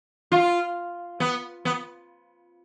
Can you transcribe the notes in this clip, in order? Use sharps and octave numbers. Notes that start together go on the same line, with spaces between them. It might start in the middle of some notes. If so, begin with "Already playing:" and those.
F4
B3
B3